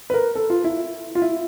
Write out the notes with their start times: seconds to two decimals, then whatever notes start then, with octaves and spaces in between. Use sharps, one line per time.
0.10 B4
0.14 A#4
0.35 A4
0.50 F4
0.64 E4
1.15 F4
1.22 E4